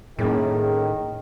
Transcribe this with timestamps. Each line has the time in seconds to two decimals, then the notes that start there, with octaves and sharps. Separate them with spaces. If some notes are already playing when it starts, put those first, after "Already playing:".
0.19 A2 D#3 A#3 C#4 E4 G#4